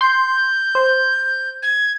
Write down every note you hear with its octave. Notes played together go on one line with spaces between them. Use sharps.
C6 G6
C5
G#6